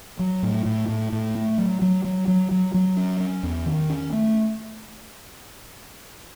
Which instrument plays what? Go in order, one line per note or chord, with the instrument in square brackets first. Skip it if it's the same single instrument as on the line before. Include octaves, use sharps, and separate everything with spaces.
[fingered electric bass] F#3
A2
A2
A2
A2
A3
F#3
F#3
F#3
F#3
F#3
F#3
C#4
C#4
E2
D#3
C#4
A3